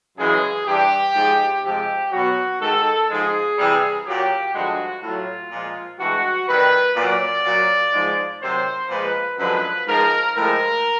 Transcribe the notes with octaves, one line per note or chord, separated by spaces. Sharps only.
F#2 C#3 E3 G#3 G#4
G2 E3 G3 G4
G#2 F3 G#3
C3 F3 G#3 G4
B2 F#3 F#4
G#2 D#3 G#3 A4
G#2 F3 G#3 G#4
C3 E3 G3
A#2 F#3 G4
G2 D3 F3 G#3 F#4
A2 F#3 F4
A#2 F3 G#3
G2 E3 G#3 F#4
C3 D#3 G3 B4
A#2 F#3 D5
A#2 F#3
G#2 F3 G#3
C3 D#3 F#3 C5
A#2 F3 G#3 B4
F#2 D3 F3 G#3 B4
G#2 F3 G#3 A#4
A2 F3 G#3 A#4